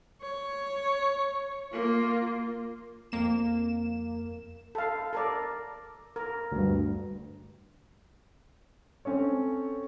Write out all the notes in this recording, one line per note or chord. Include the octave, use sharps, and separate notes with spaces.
C#5
A#3 F4
F2 A#3 E7
A4 F5
A4 A#4 D5
A#4
D2 G2
C4 C#4 A4 C#5